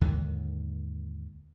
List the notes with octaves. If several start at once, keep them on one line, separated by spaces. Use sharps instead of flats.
D#2 G#2 D3 D#3